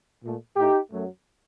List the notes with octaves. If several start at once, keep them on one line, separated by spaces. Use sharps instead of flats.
A#2 A3
A2 A3 D#4 G4
F#2 F#3 A3